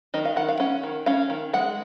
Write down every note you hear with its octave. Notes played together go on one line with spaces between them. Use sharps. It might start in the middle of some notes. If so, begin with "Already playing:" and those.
D#3 D#5
F5
D#3 F#5
F5
C#4 F#5
D#3
C#4 F5
D#3
G#3 F#5